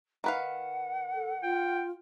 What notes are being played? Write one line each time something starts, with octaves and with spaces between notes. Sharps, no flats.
D#3 B4 F5 F#5
A4
F4 G5